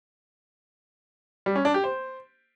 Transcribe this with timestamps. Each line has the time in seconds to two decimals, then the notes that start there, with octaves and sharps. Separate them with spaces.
1.46 G3
1.56 C#4
1.65 D4
1.74 G4
1.84 C5